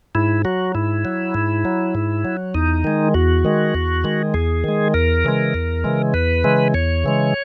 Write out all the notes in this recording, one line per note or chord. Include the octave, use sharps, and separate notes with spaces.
G#2 E4
F#3 F#4
G#2 E4
F#3
G#2
F#3
G#2
F#3
E2 D#4
D#3 G#3
E2 F#4
D#3 G#3
E2
D#3 G#3
E2 G#4
D#3 G#3
E2 A#4
C#3 E3 G#3
E2
C#3 E3 G#3
E2 B4
C#3 E3 G#3
E2 C#5
C#3 E3 G#3